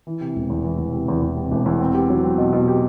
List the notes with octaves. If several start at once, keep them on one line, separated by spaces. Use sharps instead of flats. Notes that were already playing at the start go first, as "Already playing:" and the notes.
E3
C3
E1
E2
E3
E2
C3
E2
E2
C3
E1
E2
C4
G4
F#3
C4
B2
B2
G4